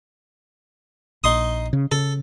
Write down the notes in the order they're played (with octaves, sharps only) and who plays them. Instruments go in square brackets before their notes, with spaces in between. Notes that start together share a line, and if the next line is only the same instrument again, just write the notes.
[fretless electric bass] A#1 [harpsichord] D#4 C6 D#6
[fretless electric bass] C#3
[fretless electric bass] C#3 [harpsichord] A4